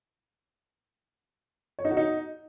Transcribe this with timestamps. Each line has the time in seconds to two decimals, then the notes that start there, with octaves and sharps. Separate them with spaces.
1.79 C#5
1.85 D#4
1.91 F#4
1.97 D#4